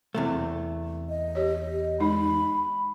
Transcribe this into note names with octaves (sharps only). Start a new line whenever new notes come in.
E2 C3 A3
D#5
G4 C#5
G#3 D#4 B5